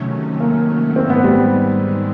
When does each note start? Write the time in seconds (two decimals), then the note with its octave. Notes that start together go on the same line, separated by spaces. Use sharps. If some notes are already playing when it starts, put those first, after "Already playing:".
Already playing: C3 D#3 F#3 A3 C#4
0.40 A#3
0.96 G#2 D#3 G#3 C4
1.10 B3
1.24 G3